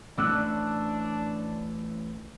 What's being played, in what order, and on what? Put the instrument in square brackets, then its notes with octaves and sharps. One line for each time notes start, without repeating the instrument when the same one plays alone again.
[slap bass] A1 A3 C#4 [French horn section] D4 [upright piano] D6 E6 F#6